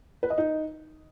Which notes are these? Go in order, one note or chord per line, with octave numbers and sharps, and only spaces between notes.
B4
D#5
D#4